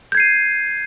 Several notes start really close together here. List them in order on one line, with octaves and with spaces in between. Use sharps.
G6 G#6 C7 D#7